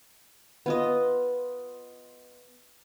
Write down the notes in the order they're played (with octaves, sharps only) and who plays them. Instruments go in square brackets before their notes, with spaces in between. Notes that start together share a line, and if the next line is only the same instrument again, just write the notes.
[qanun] B3 F4 D#5